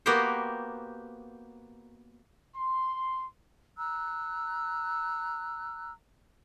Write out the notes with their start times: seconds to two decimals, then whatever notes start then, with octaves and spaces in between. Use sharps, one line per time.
0.06 A#3 B3 F#4 G4 A#4 C5
2.56 C6
3.77 A#5 E6 F#6